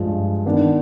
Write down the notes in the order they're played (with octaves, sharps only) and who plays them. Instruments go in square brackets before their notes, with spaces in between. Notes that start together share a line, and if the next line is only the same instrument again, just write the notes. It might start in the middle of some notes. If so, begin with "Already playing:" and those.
Already playing: [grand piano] G2 F3 G#3
D#3 B3 D4